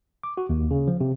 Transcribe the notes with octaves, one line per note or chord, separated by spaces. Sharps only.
D6
F#4
D#2
C#3
F3
C3